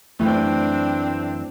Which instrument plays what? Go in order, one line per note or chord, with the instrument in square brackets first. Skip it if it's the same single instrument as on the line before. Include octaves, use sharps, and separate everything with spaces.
[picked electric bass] F#2 E3 [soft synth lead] A3 [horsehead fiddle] C4 D4